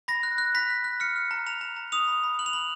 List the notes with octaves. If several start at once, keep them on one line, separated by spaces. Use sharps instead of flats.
B5 A#6
F#6
F#6
B5 B6
F#6
F#6
F6 C#7
F6
A#5
A#5 F7
A#5
A#5
D#6 F7
B5
B5
F#6 F#7
F7
B5 F#7